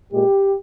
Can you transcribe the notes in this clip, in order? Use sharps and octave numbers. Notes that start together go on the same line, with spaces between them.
A#2 G#3 G4